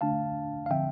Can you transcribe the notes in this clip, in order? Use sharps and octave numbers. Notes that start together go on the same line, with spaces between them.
D3 A3 D4 F5 A5
F5
D3 F3 C4 E5 G5